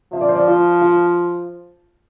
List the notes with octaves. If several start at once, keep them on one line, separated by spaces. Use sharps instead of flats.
F3 E5
D5
C5
D5
F4
F4